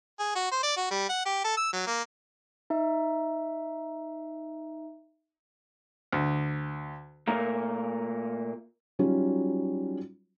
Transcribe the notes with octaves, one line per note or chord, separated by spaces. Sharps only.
G#4
F#4
C5
D5
F#4
G3
F#5
G4
A4
E6
F#3
A#3
D#4 E5
D2
A#2 A3 A#3 A#4
F#3 G3 C#4 D#4 F4